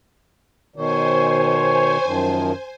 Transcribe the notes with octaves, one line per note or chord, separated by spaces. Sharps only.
B2 D#3 C5 C#5 G#5
F#2 D#3 F3